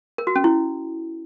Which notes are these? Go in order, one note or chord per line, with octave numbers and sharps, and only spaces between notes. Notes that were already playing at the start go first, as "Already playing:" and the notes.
A#4
F#4
C#4
E4